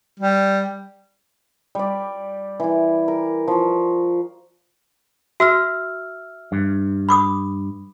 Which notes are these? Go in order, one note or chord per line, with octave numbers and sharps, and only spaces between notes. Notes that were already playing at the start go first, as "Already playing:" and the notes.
G3
G3 D5
E3 E4
A#4
F3 C#6
F#4 E5 E6 F6
G2
B5 D6 D#6